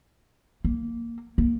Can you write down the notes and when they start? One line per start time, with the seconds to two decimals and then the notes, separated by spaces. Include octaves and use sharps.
0.65 A#3
1.38 A#3